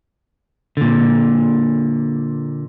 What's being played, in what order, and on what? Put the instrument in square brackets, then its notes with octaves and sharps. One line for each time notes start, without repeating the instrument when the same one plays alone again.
[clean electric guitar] A#2 D3